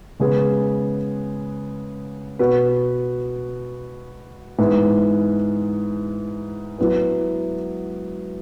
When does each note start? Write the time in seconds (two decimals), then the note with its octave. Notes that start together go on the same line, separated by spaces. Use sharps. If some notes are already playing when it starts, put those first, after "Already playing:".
0.20 C#3 G#3 B3 G#4 B4
2.39 B2 B3 F#4 B4
4.58 G#2 E3 G#3 B3
6.79 F#3 B3 E4 B4